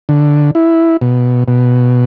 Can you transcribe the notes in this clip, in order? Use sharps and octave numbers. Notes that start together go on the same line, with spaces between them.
D3
E4
B2
B2